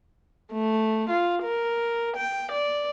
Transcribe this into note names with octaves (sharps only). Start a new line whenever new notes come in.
A3
F4
A#4
G5
D5